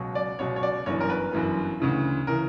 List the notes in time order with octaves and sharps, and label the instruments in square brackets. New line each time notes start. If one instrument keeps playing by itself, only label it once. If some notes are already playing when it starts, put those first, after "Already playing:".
Already playing: [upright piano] C#2 B2 F#3
D5
C#2 B2 F#3 C#5
C#5
D5
G1 F#2 E3 C#5
A#4
B4
G1 F#2 E3
D2 C#3 E3
C#3 E3 A#4